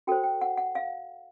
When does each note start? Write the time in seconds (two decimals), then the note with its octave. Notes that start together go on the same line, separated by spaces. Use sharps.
0.07 F#4 A4 C5 G5
0.23 G5
0.41 F#5
0.58 F#5
0.75 F5